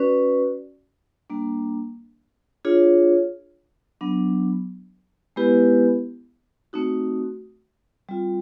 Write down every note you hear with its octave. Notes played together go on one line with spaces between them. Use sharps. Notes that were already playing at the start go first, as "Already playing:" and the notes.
Already playing: C#4 F#4 B4 D5
G3 A#3 D4
D4 F4 G#4 C#5
F#3 B3 D4
G#3 B3 E4 G4 B4
A3 C4 D#4 F#4
G3 C4 F4